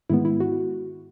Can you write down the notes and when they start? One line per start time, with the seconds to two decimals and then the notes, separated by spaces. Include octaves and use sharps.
0.10 G#2 D#3 G#3 B3 E4
0.25 E4
0.40 F#4